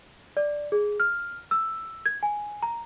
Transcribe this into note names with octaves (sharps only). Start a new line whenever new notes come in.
D5
G#4
F6
E6
G#6
G#5
A#5